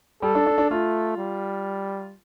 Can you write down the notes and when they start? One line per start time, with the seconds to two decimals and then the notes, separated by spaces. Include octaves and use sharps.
0.22 G3 A4
0.35 D4
0.46 D4
0.58 D4
0.70 A3 F4
1.17 G3